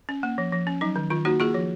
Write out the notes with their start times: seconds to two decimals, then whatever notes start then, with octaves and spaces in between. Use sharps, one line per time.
0.09 C#4
0.23 A#3
0.38 F3
0.52 F3
0.67 C#4
0.81 F#3 D#4
0.96 D#3
1.10 D#3 F4
1.25 A#3 D#4 F#4
1.40 A#3 F4 G#4
1.54 F3